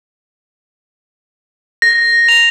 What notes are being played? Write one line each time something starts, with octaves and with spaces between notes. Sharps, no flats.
A#6
F7